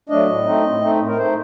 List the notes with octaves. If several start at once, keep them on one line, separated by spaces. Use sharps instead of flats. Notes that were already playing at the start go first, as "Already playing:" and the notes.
F#3 A3 D4 D#5
A2
A3 C4 D#4
A2
A3 C4 D#4
A2
A#4
A3 D#4 C5